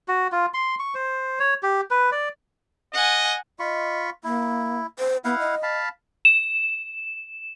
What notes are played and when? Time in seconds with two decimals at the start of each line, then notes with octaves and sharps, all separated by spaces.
0.08 F#4
0.32 F4
0.54 C6
0.79 C#6
0.95 C5
1.39 C#5
1.63 G4
1.91 B4
2.12 D5
2.94 D#5 F#5 G#5
3.60 F4 D#5 B5 C#6
4.24 A#3 E4
4.99 C5
5.25 B3 E4 F5 F#5
5.39 D#5
5.63 F5 A5 B5
6.25 E7